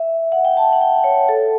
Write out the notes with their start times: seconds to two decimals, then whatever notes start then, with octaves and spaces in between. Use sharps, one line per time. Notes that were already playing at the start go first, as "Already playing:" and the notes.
Already playing: E5
0.32 F#5
0.45 G5
0.57 A5
0.73 F#5
0.81 G5
1.04 C#5
1.29 A4